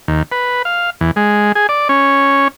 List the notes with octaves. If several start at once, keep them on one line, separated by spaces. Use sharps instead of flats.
D#2
B4
F5
E2
G#3
G#4
D5
C#4